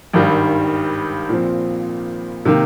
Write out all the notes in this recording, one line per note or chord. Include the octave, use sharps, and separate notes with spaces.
G#1 G2 D#3 G3
A#2 F3 C4
C3 D#3 A#3